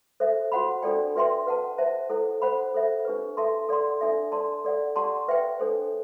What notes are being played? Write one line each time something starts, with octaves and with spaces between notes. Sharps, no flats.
A4 C5 E5
F#4 C5 F#5 B5
D4 F#4 A4 D5 G5
F#4 B4 E5 G5 C6
B4 F#5 A5
C5 E5 A5
E4 A4 C5 F#5
C5 F#5 B5
A4 C5 E5
D4 G4 B4
A4 E5 A5 C6
A4 D5 F#5 C6
D4 A4 E5
D4 A4 D5 A5 C6
A4 D5 F#5
G4 D5 F#5 A5 C6
B4 E5 G5
D4 A4 C5